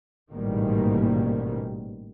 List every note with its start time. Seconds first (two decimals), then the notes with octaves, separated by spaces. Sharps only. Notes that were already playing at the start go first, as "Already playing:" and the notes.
0.32 A1 G#2 B2 D#3 G3 A#3